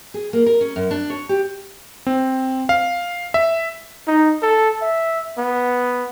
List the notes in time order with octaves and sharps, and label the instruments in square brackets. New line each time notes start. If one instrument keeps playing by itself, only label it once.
[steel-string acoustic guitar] G#4
A#3
A#4
C#4
F#2
D4
C#5
G4
[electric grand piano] C4
F5
E5
[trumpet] D#4
A4
E5
B3